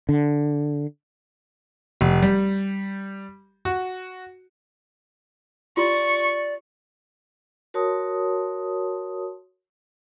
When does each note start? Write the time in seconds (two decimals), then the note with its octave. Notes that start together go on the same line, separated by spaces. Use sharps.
0.09 D3
2.01 F1
2.22 G3
3.65 F#4
5.77 F4 G4 D5 C6 C#6
7.74 F#4 A#4 C#5 A5 C6 D#6